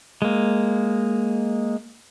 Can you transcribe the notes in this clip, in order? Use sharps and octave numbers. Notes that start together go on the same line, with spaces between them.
G#3 A#3